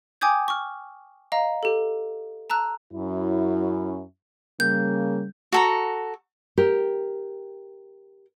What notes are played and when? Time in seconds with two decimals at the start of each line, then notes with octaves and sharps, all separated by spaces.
0.21 G5 G#5 D6 D#6 G6 G#6
0.48 C#6 F6
1.32 D#5 F5 A#5
1.63 G4 A4
2.50 A5 A#5 E6 F#6
2.93 F#2 C#4 E4
4.60 C#3 G3 A#3 G6
5.52 F#4 A4 A#5
6.58 G4 A#4